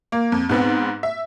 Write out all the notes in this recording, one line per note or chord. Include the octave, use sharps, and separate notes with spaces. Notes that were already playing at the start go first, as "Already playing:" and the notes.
A#3
F2
G#2 B3 C4
E5